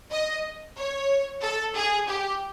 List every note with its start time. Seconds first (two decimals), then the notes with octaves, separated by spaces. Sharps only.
0.11 D#5
0.77 C#5
1.42 A4
1.75 G#4
2.08 G4